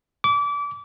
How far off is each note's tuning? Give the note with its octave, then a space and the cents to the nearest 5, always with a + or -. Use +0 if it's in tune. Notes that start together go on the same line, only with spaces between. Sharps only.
D6 -30